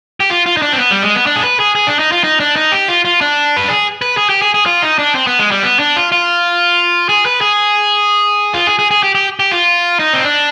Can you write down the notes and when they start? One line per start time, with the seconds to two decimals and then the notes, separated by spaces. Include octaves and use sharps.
0.20 G4
0.30 F4
0.46 F4
0.57 D#4
0.62 D4
0.72 C4
0.78 B3
0.91 G3
1.02 G#3
1.15 B3
1.26 D4
1.36 G#4
1.43 B4
1.60 G#4
1.75 G#4
1.87 D4
1.99 D#4
2.12 F4
2.24 D#4
2.40 D4
2.56 D#4
2.72 G4
2.88 F4
3.05 F4
3.21 D4
3.57 B4
3.70 G#4
4.02 B4
4.17 G#4
4.29 G4
4.42 G#4
4.54 G#4
4.66 F4
4.83 D#4
4.99 D4
5.15 C4
5.27 B3
5.39 G#3
5.51 G3
5.63 B3
5.79 D4
5.96 F4
6.12 F4
7.09 G#4
7.26 B4
7.41 G#4
8.54 F4
8.67 G#4
8.79 G#4
8.91 G#4
9.03 G4
9.15 G4
9.40 G4
9.52 F4
10.00 D#4
10.13 C4
10.24 D4